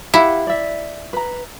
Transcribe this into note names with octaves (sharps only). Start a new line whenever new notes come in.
E4 G4 F5 F#5
D5 E5
B4 A#5